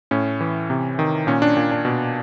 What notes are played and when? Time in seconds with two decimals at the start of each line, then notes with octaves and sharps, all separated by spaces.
0.11 A2 C#4
0.41 E3
0.70 C3
0.99 D#3
1.27 A#2 C#4
1.42 D4
1.57 A#2
1.71 D4
1.85 B2